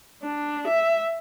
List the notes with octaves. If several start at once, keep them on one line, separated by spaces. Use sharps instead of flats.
D4
E5